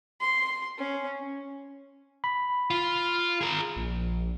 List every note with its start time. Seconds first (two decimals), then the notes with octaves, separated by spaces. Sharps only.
0.21 C6
0.78 C#4
2.24 B5
2.70 F4
3.41 G#4 A#4
3.76 A#1